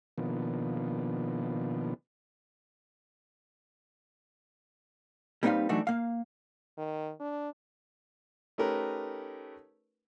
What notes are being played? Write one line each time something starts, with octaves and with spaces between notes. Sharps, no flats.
B2 D#3 F3 A#3 B3 D4
G3 A#3 C4 D#4 B4 F5
E3 F#3 A3 D4 D#4 F#4
A#3 F5
D#3
D4
A3 C#4 D#4 G4 A#4 B4